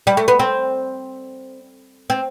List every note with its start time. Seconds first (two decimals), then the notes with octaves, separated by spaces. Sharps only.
0.07 G3
0.17 A3
0.28 B3
0.39 C4
2.10 C4